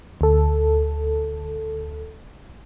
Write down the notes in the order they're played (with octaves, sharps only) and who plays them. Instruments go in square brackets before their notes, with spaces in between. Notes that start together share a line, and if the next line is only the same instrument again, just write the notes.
[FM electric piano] D2 A4